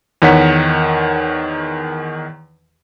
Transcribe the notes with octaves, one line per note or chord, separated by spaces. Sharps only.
E2 D#3 C#5 F#5 B6